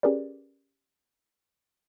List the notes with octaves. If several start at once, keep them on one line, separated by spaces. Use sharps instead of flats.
C#4 G4 G#4 A#4 B4 D5